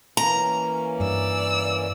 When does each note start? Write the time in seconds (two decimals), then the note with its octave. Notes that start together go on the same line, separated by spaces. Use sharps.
0.17 E3 A#3 C#4 A#5
1.00 G2 D5 E6